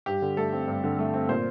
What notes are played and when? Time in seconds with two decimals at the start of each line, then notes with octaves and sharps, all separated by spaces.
0.06 G2 G4
0.22 D3
0.37 A3 A4
0.53 C4
0.68 G2
0.84 D3
0.99 A3
1.14 C4
1.29 A#2 C5